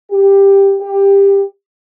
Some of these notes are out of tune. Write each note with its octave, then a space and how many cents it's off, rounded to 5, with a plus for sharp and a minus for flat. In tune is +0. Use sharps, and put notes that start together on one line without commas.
G4 +10
G4 +15